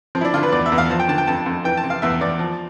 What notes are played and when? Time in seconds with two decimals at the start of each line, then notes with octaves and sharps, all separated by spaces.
0.15 F3 C4
0.21 E4
0.25 D4
0.34 D3 F4
0.43 B4
0.52 E2 D5
0.66 E5
0.72 E2
0.78 F5
0.90 F3 A5
0.99 G5
1.08 D3 A5
1.18 G5
1.27 F2 A5
1.46 F2
1.64 E3 G5
1.77 A5
1.83 C3
1.90 F5
2.02 E2 E5
2.20 E2 D5
2.39 F3